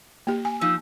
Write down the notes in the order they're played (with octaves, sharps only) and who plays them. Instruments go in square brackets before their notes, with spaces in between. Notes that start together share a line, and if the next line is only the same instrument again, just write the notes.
[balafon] A#3 G4
G#5
[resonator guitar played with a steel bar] F3 D#4 [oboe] E6